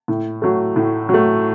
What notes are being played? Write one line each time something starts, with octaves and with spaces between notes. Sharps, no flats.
A2
F#3 A3
A2
F#3 A3